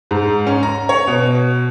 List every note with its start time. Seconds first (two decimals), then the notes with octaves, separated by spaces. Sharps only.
0.11 G#2
0.47 C#4
0.63 A#5
0.89 C#5
1.07 B2